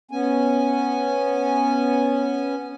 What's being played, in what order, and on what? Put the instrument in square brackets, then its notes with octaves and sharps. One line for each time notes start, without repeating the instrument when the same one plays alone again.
[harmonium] B3 C#4 G#5